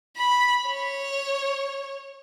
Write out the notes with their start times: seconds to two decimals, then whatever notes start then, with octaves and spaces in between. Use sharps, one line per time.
0.17 B5
0.66 C#5